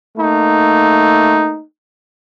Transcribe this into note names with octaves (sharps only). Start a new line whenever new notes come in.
A3 A#3 D#4